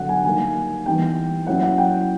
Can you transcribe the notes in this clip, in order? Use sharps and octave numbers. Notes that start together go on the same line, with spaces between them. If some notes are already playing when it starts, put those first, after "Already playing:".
Already playing: D3 F#3 B3 F#5
G#5
D#3 G3 A#3 D#4 G#5
E3 G3 B3 D#4 G5
F#3 A#3 C#4 E4 F#5
F#5
G5